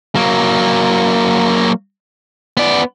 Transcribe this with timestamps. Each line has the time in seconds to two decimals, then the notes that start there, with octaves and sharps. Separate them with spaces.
0.15 F#3 A#3
2.57 B3 D5